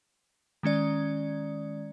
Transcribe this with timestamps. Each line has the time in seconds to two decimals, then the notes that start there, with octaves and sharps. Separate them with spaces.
0.63 D#3 G#3 C#4 D5